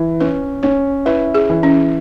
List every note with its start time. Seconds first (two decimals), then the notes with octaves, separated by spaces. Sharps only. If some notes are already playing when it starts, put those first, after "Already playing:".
Already playing: E3
0.20 C#4 B4
0.63 C#4 C#5
1.06 E4 B4
1.34 G#4
1.50 E3
1.63 C#4